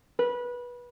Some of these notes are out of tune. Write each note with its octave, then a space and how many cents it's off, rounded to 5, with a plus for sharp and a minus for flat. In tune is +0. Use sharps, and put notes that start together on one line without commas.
B4 -20